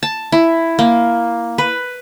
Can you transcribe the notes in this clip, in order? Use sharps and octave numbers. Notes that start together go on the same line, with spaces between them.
A5
E4
A#3
B4